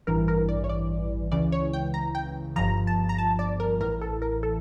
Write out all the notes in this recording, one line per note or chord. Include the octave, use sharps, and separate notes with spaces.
A1 G2 E3 A#4
A#4
D5
C#5
D5
C#2 C#3 E3 D5
C#5
G5
A#5
G5
G1 G2 F3 A#5
A5
A#5
A5
D5
A#4
A1 A2 E3 A#4
A4
A#4
A4